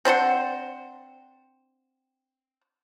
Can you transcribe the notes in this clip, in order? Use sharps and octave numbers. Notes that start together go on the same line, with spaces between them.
C4 D4 C5 F#5